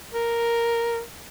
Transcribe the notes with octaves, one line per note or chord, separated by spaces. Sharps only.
A#4